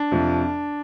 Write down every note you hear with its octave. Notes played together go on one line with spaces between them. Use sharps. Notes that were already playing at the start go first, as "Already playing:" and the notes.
Already playing: D4
F2 C3 F3